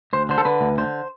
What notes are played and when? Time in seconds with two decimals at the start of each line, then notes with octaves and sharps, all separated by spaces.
0.13 D2 C5
0.29 D3 C5
0.38 A4
0.45 D3 B4
0.61 D2
0.78 D3 C5